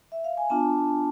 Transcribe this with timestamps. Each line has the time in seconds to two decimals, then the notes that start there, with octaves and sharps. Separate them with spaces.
0.12 E5
0.24 F5
0.37 G#5
0.50 B3 D4 F4 A5